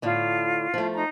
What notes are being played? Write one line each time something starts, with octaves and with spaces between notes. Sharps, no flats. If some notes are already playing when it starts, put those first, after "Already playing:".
A2 D3 A3 F4
F3 A3
D#4 A#5